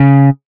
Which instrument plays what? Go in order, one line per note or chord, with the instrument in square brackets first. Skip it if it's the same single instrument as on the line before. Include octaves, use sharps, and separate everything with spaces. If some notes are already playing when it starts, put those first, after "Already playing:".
Already playing: [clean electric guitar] C#3